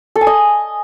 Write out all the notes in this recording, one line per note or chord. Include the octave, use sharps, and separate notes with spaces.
A4
G#5
D#5